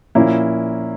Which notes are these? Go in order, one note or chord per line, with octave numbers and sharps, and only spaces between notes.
A#2 F3 A#3 C#4 E4